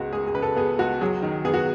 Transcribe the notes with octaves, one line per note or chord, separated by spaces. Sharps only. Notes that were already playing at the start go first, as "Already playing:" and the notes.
Already playing: C#2 C#3 G#3 B3 F#4
G#3 G#4
G#4
C#3 B4
A4
B3 G#4
C#2 F#4
F#3 G#4
D#3
B3 G#4
F#4